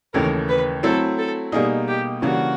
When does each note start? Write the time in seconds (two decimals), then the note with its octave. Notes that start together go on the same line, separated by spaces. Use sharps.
0.13 D#2 C#3 E3 A3 A#4
0.49 B4
0.83 F#3 A3 C4 E4 A4
1.18 A4
1.52 B2 G3 A#3 D#4 G#4
1.88 G4
2.22 C#3 E3 G3 A#3 D4 F#4